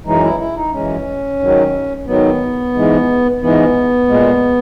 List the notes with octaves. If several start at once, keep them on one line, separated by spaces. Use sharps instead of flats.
F#2 E3 G#3 D#4
E4
E4
D#4
F#2 E3 G#3 C#4
G#2 D#3 F#3
G#2 D#3 F#3 B3
G#2 E3 G#3
G#2 E3 G#3 B3
A#2 G#3